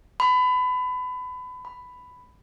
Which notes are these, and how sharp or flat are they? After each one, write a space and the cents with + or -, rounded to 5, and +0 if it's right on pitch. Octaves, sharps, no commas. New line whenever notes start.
B5 +25
B5 +10